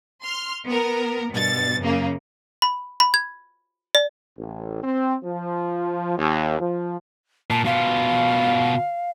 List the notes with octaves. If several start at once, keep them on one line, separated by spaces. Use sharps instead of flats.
C6 F6
B3 A#4
G2 B2 A6
F#2 C#3 A#3
B5
B5
G#6
D5
A1
C4
F3
D#2
F3
A#2 A5
B2 F4 F5